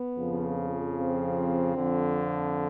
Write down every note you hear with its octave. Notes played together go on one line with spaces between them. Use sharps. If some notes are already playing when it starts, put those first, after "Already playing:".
Already playing: B3
F2 C#3 F3
C4
F2 D3 F3